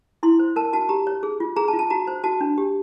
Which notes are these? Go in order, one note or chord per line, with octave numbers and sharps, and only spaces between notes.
E4 C6
C5
A#4 A5
F#4 A5
G4 A#5
C#5
G#4
F4
G#4 A#5
A5
F4
A5
F#4 A#5
C5
F#4 A5
D4
G4